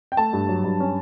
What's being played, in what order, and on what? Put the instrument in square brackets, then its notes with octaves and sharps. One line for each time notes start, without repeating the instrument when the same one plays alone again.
[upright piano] G5
A3 A5
G2
F#3
G2
C#4